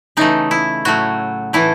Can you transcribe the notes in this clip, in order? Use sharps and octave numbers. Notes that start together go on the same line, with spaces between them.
C#3 E3 A3 D#4
E4
A2 F#3 A3 F#4
A2 E3 A3 E4